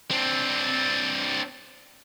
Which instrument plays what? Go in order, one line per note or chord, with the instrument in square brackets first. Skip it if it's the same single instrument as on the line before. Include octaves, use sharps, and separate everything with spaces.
[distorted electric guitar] C4 D4